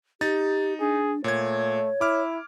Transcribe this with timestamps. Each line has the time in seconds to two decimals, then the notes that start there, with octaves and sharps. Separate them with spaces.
0.21 D#4 G4 A6
0.80 D4 G#4
1.24 A#2 A3 C#5 G#6
2.01 E4 D6 F6